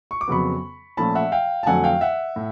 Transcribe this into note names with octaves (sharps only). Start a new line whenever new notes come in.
C#6
D6
F2 C#3 F#3 B3 B5 C#6
A#2 F3 A3 C#4 A5 B5
E5 F#5
F5 G5
A5
F2 D3 F#3 A3 F#5 G#5
F5 G5
E5 F#5
A2